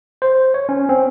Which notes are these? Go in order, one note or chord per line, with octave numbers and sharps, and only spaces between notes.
C5
C#5
C#4
C4